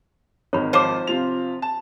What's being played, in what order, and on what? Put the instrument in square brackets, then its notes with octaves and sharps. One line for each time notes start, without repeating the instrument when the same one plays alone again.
[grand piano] G#1 D#3 [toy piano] C#5 B5
[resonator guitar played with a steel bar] F3 C5 [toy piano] C#5 D6
[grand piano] C3 F4 F7
A5